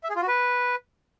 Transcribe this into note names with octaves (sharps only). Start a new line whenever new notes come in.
E5
G#4
F4
F#4
B4